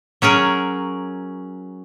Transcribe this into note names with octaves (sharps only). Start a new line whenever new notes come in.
F#3 C#4 G#4 A#4